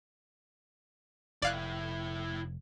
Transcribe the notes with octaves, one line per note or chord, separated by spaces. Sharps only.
F1 E4 C#5 D5 F5 F#6